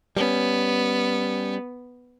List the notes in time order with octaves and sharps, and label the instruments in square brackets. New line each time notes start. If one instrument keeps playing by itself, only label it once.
[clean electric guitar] G3 C#4 [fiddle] B3